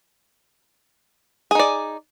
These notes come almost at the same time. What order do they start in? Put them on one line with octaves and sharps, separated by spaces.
G#4 D#4 D5